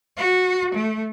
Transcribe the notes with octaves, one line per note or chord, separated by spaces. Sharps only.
F#4
A3